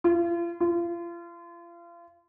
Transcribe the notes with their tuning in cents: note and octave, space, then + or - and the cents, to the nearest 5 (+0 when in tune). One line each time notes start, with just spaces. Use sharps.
F4 -40
F4 -35